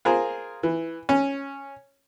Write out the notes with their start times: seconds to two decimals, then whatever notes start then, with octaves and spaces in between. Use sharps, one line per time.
0.05 F4 G#4 A#4 C5
0.63 E3
1.09 C#4